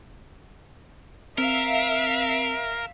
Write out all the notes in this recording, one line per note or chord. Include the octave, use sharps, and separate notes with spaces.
C4 A#4 E5 F5